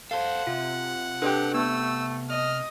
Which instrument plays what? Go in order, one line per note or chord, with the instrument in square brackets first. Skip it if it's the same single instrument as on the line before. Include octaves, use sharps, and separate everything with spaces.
[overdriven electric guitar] A4 C5 [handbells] F5 [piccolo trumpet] F#5
[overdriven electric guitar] C3 [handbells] F4
[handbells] D4 A4 B4 [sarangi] G4
[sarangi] A3 [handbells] B3 [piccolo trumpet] E6
[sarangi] D#5 [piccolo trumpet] F6